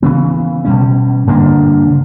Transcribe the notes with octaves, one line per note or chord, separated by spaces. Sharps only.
C#3 E3 B3
B2 G3 C#4
G2 D3 A#3 D4
C#3